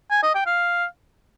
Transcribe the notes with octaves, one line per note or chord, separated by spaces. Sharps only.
G#5
D#5
G5
F5